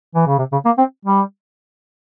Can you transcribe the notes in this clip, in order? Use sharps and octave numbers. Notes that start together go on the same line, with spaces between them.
E3
C#3
C3
C#3
A#3
C4
G3